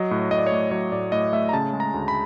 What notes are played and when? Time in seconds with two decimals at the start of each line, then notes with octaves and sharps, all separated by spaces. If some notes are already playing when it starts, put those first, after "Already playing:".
Already playing: F#3 D#5
0.11 A2
0.31 A2 D#5
0.38 D5
0.47 C#5
0.52 A3 D5
0.71 F#3 C#5
0.92 A2 D5
1.12 A2 D#5
1.33 A3 E5
1.49 A#5
1.53 C#3 A5
1.73 G#3
1.80 A#5
1.94 D2
2.08 B5